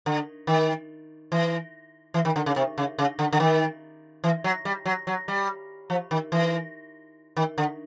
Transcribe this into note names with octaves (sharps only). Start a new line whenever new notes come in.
D3
D#3
E3
E3
D#3
D3
C#3
C3
C#3
C#3
D3
D3
D#3
E3
F#3
G3
F#3
F#3
G3
F3
D#3
E3
D#3
D3